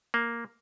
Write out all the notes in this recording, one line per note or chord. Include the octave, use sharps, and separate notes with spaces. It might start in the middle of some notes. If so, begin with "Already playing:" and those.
A#3